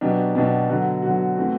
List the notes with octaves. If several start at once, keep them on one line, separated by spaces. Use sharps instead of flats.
B2 F#3 B3 D4 G4
B2 F#3 B3 D4 G4
D3 F#3 B3 F#4
D3 F#3 B3 F#4
E3 A3 C4 F#4